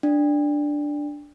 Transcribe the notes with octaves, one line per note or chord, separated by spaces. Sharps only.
D4